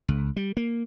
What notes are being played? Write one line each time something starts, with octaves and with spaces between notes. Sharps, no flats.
C#2
G3
A#3